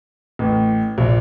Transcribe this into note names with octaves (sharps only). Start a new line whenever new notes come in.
A1
A#1